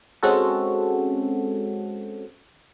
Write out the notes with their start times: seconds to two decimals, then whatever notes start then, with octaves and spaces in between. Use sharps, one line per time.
0.23 G#3 C4 C#4 F#4 A4